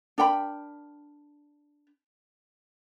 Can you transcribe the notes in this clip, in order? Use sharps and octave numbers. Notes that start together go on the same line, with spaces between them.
D4 A#4 G5 B5